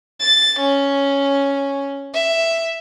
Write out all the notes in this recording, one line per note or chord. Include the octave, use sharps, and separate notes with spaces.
A6
C#4
E5